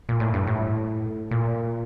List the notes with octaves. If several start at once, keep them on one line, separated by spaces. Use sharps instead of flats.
A#2
A2
G2
A2
A#2